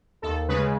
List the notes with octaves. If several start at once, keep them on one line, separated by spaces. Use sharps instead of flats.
D#2 A4
C#3 G#3 B4